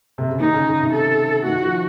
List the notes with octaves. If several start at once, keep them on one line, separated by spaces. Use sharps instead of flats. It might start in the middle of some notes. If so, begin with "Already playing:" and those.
C3
C#3
D#3 D#4
C#3
C#3
C3
A4
D#3 F#4
F3